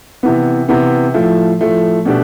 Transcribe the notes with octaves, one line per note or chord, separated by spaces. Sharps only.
C3 E3 B3
C3 E3 B3
A2 F3 A3
A2 F3 A3
B2 A3 D4 G4